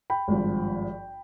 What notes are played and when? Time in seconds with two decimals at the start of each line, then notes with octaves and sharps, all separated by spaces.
0.10 G5 B5
0.28 G#1 G2 F3